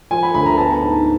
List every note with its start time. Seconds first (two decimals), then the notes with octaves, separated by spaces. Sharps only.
0.11 F3 G#5
0.23 B5
0.34 D2 B5
0.46 A#5
0.58 B3 A5
0.82 G#2